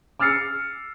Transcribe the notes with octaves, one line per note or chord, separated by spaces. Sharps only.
D6 E6 F6 A6 C7 C#7